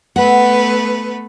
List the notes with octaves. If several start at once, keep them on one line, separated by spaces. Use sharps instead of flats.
A3 B3 B4 F#5